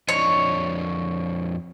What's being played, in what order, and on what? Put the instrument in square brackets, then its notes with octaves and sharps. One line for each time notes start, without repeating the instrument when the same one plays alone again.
[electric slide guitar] F2 D4 D#5 [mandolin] C#5